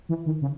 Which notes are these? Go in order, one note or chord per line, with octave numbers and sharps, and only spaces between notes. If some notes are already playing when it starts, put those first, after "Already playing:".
E3
D#3
C#3